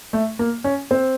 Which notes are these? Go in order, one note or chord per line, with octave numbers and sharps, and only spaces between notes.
A3
A#3
C#4
C4